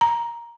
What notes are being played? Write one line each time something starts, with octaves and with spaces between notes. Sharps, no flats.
A#5